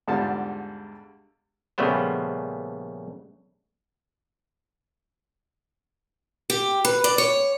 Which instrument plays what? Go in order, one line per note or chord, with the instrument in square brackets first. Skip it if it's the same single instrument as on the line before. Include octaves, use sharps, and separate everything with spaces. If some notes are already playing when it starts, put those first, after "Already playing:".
[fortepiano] E2 G#2 D3 G3 F4 A5
[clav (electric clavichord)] A#1 C#3 G3 A3 B3 C5
[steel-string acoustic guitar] G4
B4
D5
C#5